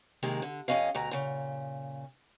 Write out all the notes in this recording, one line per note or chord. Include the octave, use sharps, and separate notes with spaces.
C3 D#3 G#3 A#3
D3
F2 A#2 C#4 D#5 F5
D2 B2 A#5
A#2 C#3